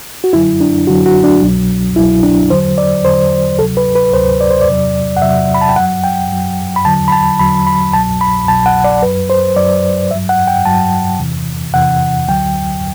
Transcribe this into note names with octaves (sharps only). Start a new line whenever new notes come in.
F#4
F#2 D3 F#3 E4
D4
F#2 D3 F#3 F#4
F#4
D4
C2 B2 F#3
C2 B2 F#3 E4
D4
E2 D3 F#3 C5
D5
E2 D3 F#3 C5
D2 C3 F#3 A4
B4
B4
D2 C3 F#3 C5
D5
C5
D5
E2 C3 F#3
F#5
E2 C3 F#3 E5
B5
A5
G5
F#2 F#3 F#5
G5
F#2 F#3
B5
E2 D3 F#3 A5
B5
A5
E2 D3 F#3 B5
B5
C2 B2 F#3 A5
B5
C2 B2 F#3 A5
F#5
D5
F#2 F#3 B4
C5
F#2 F#3 D5
G2 F#3 E5
F#5
G5
G2 F#3 A5
E2 C3 E3
E2 C3 E3 F#5
D2 D3 F#3 G5